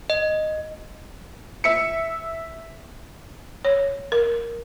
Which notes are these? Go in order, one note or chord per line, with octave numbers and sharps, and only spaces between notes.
D#5
E5 C#7
C#5
A#4